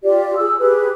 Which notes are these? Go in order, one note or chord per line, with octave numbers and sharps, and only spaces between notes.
F4 G4 D5
G#4 E6
G4 G#4 B4